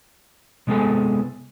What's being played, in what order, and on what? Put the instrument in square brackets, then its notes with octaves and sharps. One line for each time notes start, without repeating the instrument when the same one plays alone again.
[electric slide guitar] C3 G#3 B3 G#4 A4 G#5